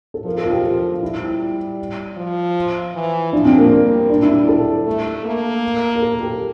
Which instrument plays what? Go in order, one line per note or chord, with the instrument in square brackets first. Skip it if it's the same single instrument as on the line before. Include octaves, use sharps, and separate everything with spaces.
[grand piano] A4
[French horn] F3 [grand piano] A#4
[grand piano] A4
F4
G4
F4
[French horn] G3 [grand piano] E4
[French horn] F3
E3
[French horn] F3 [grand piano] D4
[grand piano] C4
A#3
[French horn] G3
[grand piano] D4
E4
A4
[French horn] A3
A#3
[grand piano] A#4
A4
G4